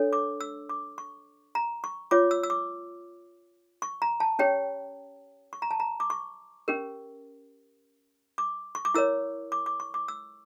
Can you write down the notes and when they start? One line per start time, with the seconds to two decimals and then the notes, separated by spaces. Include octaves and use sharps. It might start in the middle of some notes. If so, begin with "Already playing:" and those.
Already playing: D4 A4 C#5
0.13 D6
0.41 E6
0.69 D6
0.98 C#6
1.55 A#5
1.84 C#6
2.11 F4 C#5 D6
2.31 E6
2.43 E6
2.50 D6
3.82 C#6
4.02 A#5
4.20 A5
4.39 C#4 G4 C#5 G5
5.53 C#6
5.62 A#5
5.71 A5
5.80 A#5
6.00 D6
6.10 C#6
6.68 C#4 G4 A#4
8.38 D6
8.75 C#6
8.85 D6
8.94 E4 A#4 C#5 E6
9.52 D6
9.66 D6
9.80 C#6
9.94 D6
10.08 E6